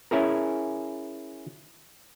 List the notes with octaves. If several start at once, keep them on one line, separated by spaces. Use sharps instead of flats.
C#4 E4 G#4 A#4